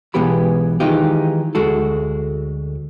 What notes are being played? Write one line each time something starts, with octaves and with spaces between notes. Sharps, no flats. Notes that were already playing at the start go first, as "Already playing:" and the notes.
B1 E3 G#3 B3 G4 B5
D#3 E3 G#3 D#4 F4 G4
D2 G#3 F#4 A4